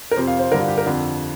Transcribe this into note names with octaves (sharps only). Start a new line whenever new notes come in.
A#4
F2 C3 C5
F5
C5
G2 D3 A#4
F4
G4
A#4
F2 D3